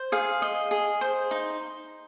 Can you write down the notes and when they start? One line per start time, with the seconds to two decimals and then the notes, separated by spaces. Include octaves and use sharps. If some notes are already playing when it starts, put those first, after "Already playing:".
Already playing: C5
0.12 G#4 F5
0.42 D#5
0.71 G#4
1.01 C5
1.31 D#4